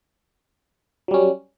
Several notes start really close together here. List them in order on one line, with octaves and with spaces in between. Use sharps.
F#3 G3 C#4